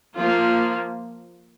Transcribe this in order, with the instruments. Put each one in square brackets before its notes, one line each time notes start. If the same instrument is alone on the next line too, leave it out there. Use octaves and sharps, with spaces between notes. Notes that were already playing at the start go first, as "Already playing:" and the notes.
[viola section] F3 A#3 F4